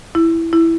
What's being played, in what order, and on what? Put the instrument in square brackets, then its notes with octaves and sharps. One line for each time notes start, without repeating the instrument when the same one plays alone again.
[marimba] E4
E4